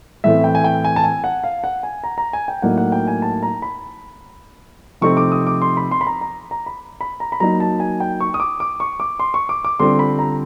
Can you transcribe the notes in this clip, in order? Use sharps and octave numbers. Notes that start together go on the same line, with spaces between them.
A2 E3 A3 C4 E5
G5
G#5
G5
G#5
A5
G#5
F#5
F5
F#5
G#5
A#5
A#5
G#5
G5
A2 F#3 A#3 D#4 F#5
F#5
G5
G#5
A5
A#5
B5
C3 F3 A3 C4 D#4 C#6
D6
D#6
D6
C6
B5
C6
B5
A#5
A#5
A#5
B5
B5
A#5
B5
F#3 A#3 D#4 A#5
A5
G#5
G5
C#6
D#6
D6
D6
C#6
D6
C6
C#6
D6
D6
D3 G3 C4 F4 C6
B5
A#5